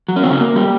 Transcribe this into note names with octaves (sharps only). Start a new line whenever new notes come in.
F#3
C#4
D#3 C4
C#3 C#4
A#3
G3